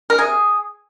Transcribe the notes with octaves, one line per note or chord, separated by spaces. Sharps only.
A#4
C3 G#4